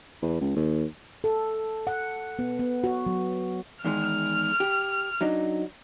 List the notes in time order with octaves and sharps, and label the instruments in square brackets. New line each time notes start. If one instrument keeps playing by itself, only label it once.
[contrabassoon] E2
C#2
D#2
[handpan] A4
F#5
B3
B3
F#4
F#3
[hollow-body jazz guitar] E2 D#3 G#3 [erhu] F6
[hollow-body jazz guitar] G4
F#3 D4 D#4